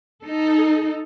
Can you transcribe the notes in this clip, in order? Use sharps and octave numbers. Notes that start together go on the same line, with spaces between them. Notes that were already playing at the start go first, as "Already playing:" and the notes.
D#4 A4